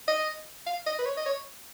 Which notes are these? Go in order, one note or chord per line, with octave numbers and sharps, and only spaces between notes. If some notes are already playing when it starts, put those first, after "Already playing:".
D#5
F5
D#5
B4
C#5
D#5
C#5